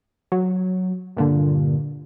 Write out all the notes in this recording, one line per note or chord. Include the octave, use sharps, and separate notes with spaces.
F#3
G2 A#2 D3